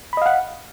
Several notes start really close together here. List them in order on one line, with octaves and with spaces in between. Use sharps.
B5 D#5 F5 F#5